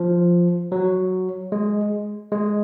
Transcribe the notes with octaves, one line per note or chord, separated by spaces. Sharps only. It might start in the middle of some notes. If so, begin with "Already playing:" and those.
Already playing: F3
F#3
G#3
G#3